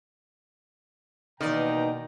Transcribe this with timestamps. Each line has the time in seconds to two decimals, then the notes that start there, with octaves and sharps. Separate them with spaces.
1.41 B2 D#3 E3 A#3 D5 D#5 G5 A#5